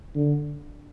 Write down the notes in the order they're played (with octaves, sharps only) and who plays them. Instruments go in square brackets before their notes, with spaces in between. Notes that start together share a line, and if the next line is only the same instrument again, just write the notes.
[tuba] D3